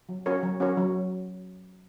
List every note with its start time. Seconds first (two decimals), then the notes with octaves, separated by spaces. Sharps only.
0.09 F#3
0.26 C#4 F#4 A#4 C#5
0.43 F#3
0.60 C#4 F#4 A#4 C#5
0.77 F#3